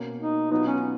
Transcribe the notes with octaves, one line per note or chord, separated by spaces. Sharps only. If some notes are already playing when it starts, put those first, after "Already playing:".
Already playing: B2 A#3 C#4
D#4
B2 F#3 B3 D#4 F4
C#4